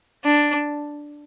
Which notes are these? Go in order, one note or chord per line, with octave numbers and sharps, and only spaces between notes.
D4